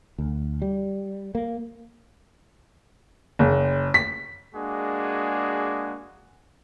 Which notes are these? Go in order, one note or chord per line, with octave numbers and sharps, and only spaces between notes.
D2
G3
A#3
F#1
B6
G#3 A#3 D4 F#4 G#4